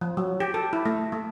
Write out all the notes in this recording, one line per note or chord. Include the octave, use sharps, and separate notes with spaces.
F3
F#3
G4
A4
E4
A3
A3